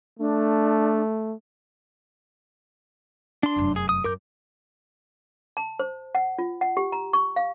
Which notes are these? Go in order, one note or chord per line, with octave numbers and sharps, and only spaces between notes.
A3 D4
D4 C6
F1 F#2
G#4
D#6
F#2 A#4 D6 G6
A5
C5
F#5
F4
F#5
G4
A#5
C#6
F5